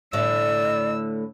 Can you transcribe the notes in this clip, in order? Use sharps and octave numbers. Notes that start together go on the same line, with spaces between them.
A2 D3 D5 E5 E6